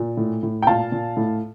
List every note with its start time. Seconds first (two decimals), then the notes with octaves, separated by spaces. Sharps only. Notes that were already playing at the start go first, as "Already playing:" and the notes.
Already playing: A#2
0.17 A2
0.43 A2
0.62 G5
0.67 A#2 F5 A5
0.92 A#2
1.17 A2